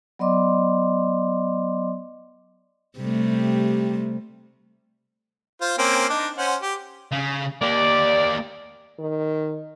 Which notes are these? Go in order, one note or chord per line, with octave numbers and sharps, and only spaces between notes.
F#3 B3 D5 D#5 C6 D6
C3 G3 A3
F4 C5
A#3 C4 C#4
D4 D#4
C#4 C5 F#5
G4
C#3
A#3 G4 D5
D#3